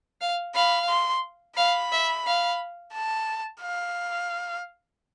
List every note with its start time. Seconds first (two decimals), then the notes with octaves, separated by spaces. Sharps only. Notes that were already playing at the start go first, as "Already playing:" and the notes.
0.21 F5
0.55 F5 B5
0.89 C6
1.57 F5 B5
1.92 E5
2.26 F5
2.94 A5
3.62 F5